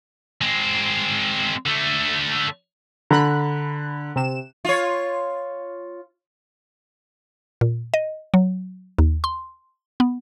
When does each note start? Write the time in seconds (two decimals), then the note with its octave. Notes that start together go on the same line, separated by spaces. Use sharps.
0.41 G#3 C4
1.66 D3 A3
3.11 D3 A#5 B5 F#6
4.16 C3 E7
4.65 F4 C#5
7.61 A#2
7.94 D#5
8.34 F#3
8.98 D#2
9.24 C6
10.00 B3